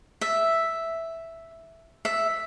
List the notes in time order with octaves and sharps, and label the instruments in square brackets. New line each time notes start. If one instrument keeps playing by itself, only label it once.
[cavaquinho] E5
E5